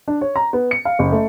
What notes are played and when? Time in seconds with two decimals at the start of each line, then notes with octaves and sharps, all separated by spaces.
0.08 D4
0.21 C#5
0.36 A#5
0.53 B3
0.71 C#7
0.85 F5
0.99 F#1
1.12 A3